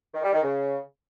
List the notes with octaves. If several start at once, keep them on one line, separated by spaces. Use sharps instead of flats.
D#3
G3
D#3
C#3